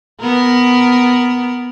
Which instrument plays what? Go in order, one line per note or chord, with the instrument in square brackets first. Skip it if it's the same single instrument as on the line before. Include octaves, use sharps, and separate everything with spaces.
[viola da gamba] B3 A#4